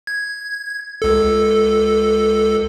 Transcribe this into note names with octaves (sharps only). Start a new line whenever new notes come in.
G#6
C#2 A4